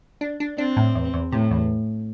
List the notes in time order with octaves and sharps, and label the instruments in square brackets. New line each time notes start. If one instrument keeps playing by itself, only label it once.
[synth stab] D4
D4
[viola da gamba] C4 [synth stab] D4
[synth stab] A2
E2
E2
[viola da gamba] A2 [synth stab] C3
[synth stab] E2